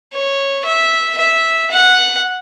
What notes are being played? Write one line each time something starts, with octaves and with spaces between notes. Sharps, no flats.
C#5
E5
E5
F#5